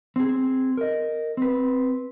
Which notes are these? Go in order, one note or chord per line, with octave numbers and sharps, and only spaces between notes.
C4 G#4
A#4 D#5
C4 B4